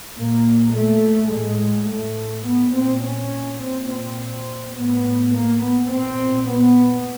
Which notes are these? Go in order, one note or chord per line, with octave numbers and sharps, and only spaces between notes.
A#2 A#3
A3
A2 G#3
A3
A#2 B3
C4
C#4
A#2 C4
C4
A2 B3
A#3
B3
A#2 C4
B3